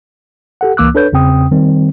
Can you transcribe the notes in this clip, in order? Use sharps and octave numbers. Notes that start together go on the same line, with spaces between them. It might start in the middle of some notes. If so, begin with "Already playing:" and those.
G4 A4 F#5
C#2 E3 A#3 D6 E6 F#6
D4 A4 B4 C#5 G6
E2 C#3 C4 G5 D#6
D#3 G3 C4